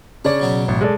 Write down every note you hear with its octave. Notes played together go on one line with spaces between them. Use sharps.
C#3 D4 C#5 D5
B2 F#3 B3
A1
G#3 A4 D5